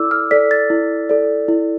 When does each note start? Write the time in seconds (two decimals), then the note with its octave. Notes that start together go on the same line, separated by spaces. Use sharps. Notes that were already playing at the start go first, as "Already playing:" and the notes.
Already playing: E4 A4 D5 D6 E6
0.11 F6
0.31 A4 D5 B6
0.51 A6
0.70 E4
1.09 A4 D5
1.48 E4